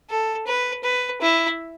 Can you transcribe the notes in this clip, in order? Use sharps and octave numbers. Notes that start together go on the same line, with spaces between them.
A4
B4
B4
E4